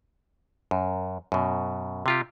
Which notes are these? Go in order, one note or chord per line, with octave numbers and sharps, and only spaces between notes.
F#2
F#2 B2
C3 F4 G4